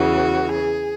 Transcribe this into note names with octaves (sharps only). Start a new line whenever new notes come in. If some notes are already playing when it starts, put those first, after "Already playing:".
Already playing: E2 C#3 E3 F#4
G#4